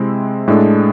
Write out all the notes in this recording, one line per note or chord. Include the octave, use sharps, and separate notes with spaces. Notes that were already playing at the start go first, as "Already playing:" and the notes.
Already playing: C3 G#3 C4 E4
A2 G#3 D4 A4